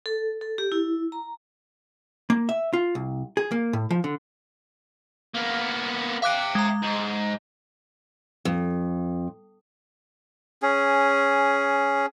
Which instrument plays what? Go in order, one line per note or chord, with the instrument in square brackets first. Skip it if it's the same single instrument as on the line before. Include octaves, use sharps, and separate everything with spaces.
[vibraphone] A4
A4
G4
E4
A#5
[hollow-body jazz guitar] A#3
E5
F4
C2
G#4
A#3
A2
F3
D3
[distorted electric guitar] A#3 B3
[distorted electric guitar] E5 G5 [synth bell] F5 D6 F#6
[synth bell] G#3 A#5
[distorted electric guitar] G#2
[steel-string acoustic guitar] F2
[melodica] C#4 G#4